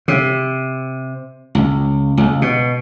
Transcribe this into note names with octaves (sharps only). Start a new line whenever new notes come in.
C3
C#2
C#2
B2